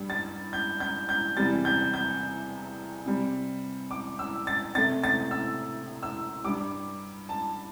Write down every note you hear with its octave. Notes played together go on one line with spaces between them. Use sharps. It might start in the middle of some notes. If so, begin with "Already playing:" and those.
Already playing: G2 G3
A6
G6
G6
G6
E2 C3 G3 A6
G6
G6
C3 G3
D6
E6
A6
C3 A3 A6
A6
E6
E6
G2 G3 D6
A5